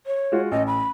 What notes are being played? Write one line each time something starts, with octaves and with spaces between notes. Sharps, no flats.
C#5
G#3 F4 F#4
A1 D#5
B5